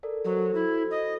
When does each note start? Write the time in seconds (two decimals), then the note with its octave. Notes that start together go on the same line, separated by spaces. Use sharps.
0.03 A4 A#4 D5
0.25 F#3 F#4 A4 C5
0.55 E4
0.91 D#5